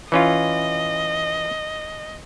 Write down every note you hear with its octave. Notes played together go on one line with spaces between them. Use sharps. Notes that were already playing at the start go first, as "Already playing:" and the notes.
E3 C#4 F4 D#5